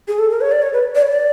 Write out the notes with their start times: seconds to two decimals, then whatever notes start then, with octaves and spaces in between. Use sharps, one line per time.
0.08 G#4
0.19 A4
0.31 A#4
0.41 C#5
0.52 D5
0.62 C#5
0.73 B4
0.95 D5
1.02 C#5
1.11 D5